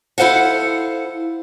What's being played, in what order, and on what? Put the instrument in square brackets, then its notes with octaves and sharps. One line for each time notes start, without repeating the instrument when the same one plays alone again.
[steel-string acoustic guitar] E4 A4 C5 F5 F#5